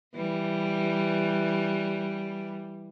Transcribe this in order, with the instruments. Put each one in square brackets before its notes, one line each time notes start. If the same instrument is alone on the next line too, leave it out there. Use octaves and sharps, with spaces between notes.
[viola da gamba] E3 G3